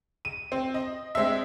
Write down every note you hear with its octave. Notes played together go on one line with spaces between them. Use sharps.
D#7
C4
D#5
G#3 C4 D4 D#5 E5